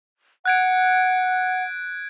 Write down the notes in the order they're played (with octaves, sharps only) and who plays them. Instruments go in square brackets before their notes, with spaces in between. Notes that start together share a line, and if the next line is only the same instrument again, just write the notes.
[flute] F#5 [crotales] F#6 G#6 D7